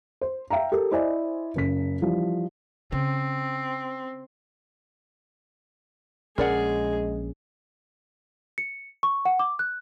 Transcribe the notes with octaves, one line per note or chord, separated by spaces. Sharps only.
C5
E5 F5 G5 A#5
G4 A4 A#4
E4 C5 D5 D#5 G#5
F#1 C#3 B6
E3 F3 G3
C#3 C4
A#1 G#3 C#4 G#4 A#4 D5 F#5
C#7
C#6
F#5
D6
F#6